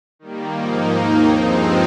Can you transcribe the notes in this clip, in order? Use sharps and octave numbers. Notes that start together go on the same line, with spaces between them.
D#3 G3 A#3
G#2 F3 A#3 D#4
D#2 D#3 A#3 D#4
G2 F3 G#3 C4 D#4